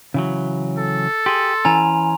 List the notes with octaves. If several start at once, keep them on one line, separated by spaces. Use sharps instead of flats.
C#3 E3 F#3
A4
G4 G#4 C6
E3 C#4 G#5 A#5 F7